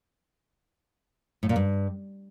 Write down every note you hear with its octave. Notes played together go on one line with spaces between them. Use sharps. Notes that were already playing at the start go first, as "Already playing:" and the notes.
A2
A#2
G2